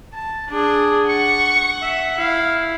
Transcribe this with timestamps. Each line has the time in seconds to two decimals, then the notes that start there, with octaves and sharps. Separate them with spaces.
0.14 A5
0.50 D4 G#4
1.09 F#5 C#6
1.82 E5
2.18 E4 F5